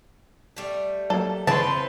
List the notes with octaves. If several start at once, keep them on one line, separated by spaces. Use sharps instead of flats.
G3 A3
F#3 A#3 A4
C#3 E3 C4 E4 B4 C#5 A5 C6